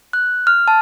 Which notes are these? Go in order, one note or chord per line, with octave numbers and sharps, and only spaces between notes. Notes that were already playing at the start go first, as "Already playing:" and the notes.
F#6
F6
A5